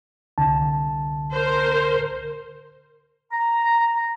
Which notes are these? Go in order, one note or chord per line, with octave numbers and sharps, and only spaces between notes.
C2 D3 A5
A#4 C5
A#5